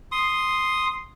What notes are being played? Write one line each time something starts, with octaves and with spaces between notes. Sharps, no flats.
C6 D#6